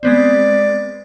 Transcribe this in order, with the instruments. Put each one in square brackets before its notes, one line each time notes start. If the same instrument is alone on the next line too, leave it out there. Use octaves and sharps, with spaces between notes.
[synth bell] G#3 B3 C4 [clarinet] D5